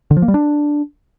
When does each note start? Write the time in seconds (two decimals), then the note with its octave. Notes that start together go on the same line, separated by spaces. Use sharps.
0.11 D3
0.17 F3
0.22 A#3
0.28 G3
0.34 D4